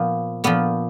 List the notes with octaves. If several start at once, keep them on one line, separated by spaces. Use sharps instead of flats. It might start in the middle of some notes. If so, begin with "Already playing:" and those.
Already playing: A#2 F3 B3
A#2 F3 B3